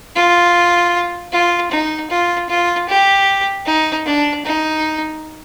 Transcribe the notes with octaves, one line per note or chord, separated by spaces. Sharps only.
F4
F4
D#4
F4
F4
G4
D#4
D4
D#4